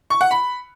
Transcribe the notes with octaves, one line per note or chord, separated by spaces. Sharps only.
C#6
F#5
B5